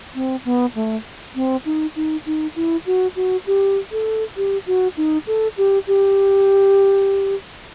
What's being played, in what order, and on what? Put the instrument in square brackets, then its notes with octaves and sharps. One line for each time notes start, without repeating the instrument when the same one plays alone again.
[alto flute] C4
B3
A3
C4
D#4
D#4
D#4
E4
F#4
F#4
G4
A4
G4
F#4
D#4
A4
G4
G4